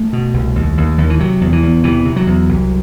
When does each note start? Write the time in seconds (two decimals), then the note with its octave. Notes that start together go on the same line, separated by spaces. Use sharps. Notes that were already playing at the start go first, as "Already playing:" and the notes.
Already playing: A3
0.13 B2
0.34 C2
0.56 D#2
0.77 D#2
0.98 D#2
1.10 E3
1.19 C3 F#3
1.41 E2
1.53 E3
1.63 E2
1.84 C3 E3
2.05 C3
2.16 F#3
2.27 E2
2.49 C2